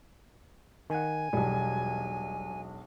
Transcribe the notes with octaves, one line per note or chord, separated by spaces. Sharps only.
D#3 F#5 G#5
E1 B1 G3